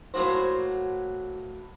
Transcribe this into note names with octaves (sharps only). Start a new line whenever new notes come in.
A2 F#3 A#3 F#4 C5